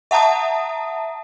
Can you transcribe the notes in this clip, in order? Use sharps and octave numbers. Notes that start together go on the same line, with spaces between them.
E5 F#5 A5 A#5 D#6